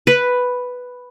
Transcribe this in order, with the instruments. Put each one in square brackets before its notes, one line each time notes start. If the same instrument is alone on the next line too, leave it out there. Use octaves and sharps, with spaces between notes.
[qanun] B4